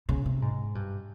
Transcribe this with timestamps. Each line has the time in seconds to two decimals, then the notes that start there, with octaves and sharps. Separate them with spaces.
0.09 C#3
0.26 C3
0.42 G#2
0.75 G2